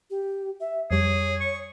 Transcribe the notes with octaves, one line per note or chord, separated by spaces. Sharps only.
G4
E5
F2 G3 G#4 C#5
C#6